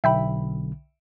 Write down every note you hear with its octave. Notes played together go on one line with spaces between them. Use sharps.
B1 D3 E5 G5 B5